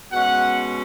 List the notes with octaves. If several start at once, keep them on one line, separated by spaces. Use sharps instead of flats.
B2 G#3 C#4 F#5